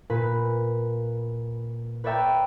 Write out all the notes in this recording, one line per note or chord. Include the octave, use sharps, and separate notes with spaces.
A#2 B4 B6
B4 C#5 D5 E5 G5 A#5